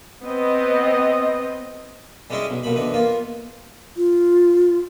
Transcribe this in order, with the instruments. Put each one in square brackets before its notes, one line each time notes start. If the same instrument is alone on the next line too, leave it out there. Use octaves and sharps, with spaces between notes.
[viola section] B3 C4 D#5
[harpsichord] G3 G#3 C#4 E4 G#4 D#5
B1
B1 A#2 B5
D3 E3 D#4
A#3 B3 F4
[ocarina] F4